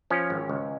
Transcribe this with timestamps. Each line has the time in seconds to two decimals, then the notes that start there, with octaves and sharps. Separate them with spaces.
0.10 F3 C#4
0.30 G#1
0.49 C#2